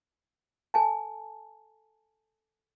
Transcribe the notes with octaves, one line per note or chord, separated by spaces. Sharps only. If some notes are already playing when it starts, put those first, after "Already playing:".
A4 G#5 A5